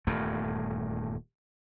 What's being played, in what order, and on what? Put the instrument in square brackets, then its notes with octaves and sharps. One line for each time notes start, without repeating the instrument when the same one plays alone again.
[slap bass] D#1 E2 G2 A3